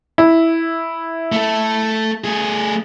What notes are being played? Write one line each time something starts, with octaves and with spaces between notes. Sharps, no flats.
E4
A3 A4
A3 G#4